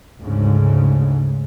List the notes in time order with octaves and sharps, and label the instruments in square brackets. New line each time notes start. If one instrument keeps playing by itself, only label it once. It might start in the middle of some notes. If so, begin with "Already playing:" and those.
[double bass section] D2 G#2 C#3